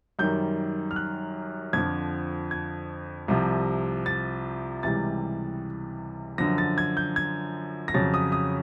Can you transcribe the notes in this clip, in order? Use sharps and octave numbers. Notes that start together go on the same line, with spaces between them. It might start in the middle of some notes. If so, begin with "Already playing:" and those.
F#2 D#3 G3 G6
F6
F#6
F2 D3 F3 G#6
G#6
C2 C3 F3
A6
C#2 C3 E3 G3 A6
F#2 D3 F3 A#6
A6
G#6
G6
G#6
A#6
F2 C#3 F#3 A6
D#6
D#6